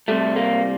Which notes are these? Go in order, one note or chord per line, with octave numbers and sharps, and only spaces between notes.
C3 G3 A3
A#3